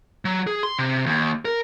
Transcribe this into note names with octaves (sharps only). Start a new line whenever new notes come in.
F#3
G#4
C6
C3
D#2
A#4